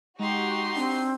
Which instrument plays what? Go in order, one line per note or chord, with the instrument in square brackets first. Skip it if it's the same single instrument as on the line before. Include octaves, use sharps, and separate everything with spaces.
[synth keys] G#3 [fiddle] D#4 C6 [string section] F#4 G4
[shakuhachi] C4 [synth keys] D4